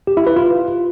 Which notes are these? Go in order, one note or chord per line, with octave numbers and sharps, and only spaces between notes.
G4
E4
B4
F4